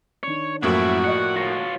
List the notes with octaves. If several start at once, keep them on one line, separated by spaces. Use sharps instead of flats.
D#3 D4 C#5
F#2 A2 F3 A#3 E4 F#4
D5 D#5 F#5
F4 C#5 A#6